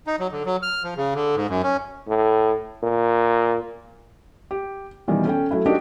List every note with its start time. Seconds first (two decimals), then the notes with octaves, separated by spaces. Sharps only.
0.07 D#4
0.19 F#3
0.32 D3
0.45 F#3
0.62 F6
0.83 F3
0.97 C#3
1.15 D3
1.36 G#2
1.49 F#2
1.63 C#4
2.08 A2
2.83 A#2
4.51 G4
5.08 B2 D#3 E3 G3
5.25 C#4 A4 G5
5.51 F#3 A3 E4
5.66 D4 D#4 F#4 G4 A#4 D#5